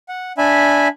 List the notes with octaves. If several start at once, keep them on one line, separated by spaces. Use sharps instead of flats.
F#5
D4 E5 G#5 B5